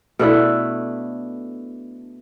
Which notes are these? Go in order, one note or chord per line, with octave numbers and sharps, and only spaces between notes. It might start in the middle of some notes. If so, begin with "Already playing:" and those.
B2 A3 D4 E4